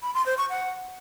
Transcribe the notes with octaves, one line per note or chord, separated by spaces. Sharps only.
B5
C6
C5
C#6
F#5